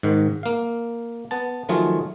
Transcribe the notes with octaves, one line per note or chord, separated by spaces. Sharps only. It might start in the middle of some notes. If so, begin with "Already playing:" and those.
G#2 D#3
A#3 F5
B3 A5
D#3 F3 F#3 A3 F4 G#4